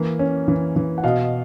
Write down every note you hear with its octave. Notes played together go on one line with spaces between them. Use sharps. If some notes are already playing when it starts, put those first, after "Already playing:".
Already playing: E3 A#3
C#4
E3
E3
F#5
B2 D#5 F5